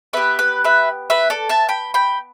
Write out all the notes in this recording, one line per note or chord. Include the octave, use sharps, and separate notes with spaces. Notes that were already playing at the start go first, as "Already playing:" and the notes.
B3 G4 B4 E5
B4
B4 E5
B4 E5
A4 D5
E5 A5
G5 B5
G5 B5